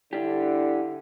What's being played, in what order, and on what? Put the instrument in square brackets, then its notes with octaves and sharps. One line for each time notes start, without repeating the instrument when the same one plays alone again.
[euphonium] D3 [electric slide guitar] D4 G4 [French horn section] E4